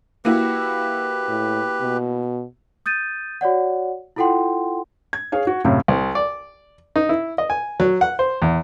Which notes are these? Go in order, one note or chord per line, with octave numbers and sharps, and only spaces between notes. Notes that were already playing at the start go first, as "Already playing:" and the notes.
A#3 E4 F#4 G4 B4
A2
B2
D#6 G6 A6 D#7
F#4 C#5 D5 F#5
E4 F4 A4 F#5 G5 C6
G#6
G#4 C#5 F5
F#4
F#2 A2 C3 F5
C2
D5
D#4
E4
D#5
G#5
F#3
F#5
C5
E2